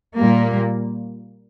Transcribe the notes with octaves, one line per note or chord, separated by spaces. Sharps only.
A#2 G3 A#3